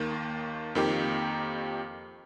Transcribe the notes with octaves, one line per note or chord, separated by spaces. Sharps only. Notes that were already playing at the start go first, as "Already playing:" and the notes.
Already playing: D#2 D#3 A#3
F2 D#3 A#3 D#4 G4